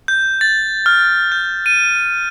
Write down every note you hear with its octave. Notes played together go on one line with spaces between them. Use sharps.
G6
A6
F6
G6
D#7